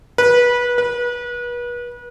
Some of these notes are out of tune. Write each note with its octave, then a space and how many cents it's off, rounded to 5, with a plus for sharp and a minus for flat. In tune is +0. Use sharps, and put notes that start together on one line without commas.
B4 -25
B4 -35